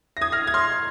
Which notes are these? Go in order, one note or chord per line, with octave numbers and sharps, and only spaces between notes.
A#6
D#6 G#6
F6 A#6
G#6
C6 F6